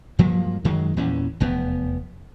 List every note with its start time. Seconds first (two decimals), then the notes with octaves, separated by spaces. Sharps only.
0.19 G2 F3 F#3 A#3
0.65 F#2 D#3 F#3 G#3
0.97 E2 A#2 E3 C#4
1.40 F1 E2 B3